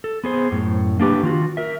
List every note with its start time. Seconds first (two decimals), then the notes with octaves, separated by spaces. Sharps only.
0.04 A4
0.24 B3 G#4 C5
0.52 F#2 A2
1.00 A#3 D4 G4 B4
1.23 D#3 F4 F#4
1.57 A#4 E5